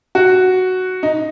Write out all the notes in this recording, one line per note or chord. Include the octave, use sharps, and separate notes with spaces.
F#4
D#4